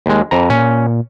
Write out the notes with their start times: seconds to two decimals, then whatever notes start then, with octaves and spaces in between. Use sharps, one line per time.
0.06 D#2 G#3
0.31 F2 A#5
0.50 A#2 C#4